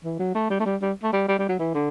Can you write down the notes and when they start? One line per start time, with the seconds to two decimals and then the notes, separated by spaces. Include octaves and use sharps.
0.04 E3
0.19 F#3
0.35 A3
0.50 G3
0.60 A3
0.66 G3
0.82 G3
1.03 A3
1.13 G3
1.28 G3
1.39 G3
1.49 F#3
1.59 E3
1.74 D3